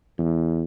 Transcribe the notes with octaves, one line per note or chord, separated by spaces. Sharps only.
E2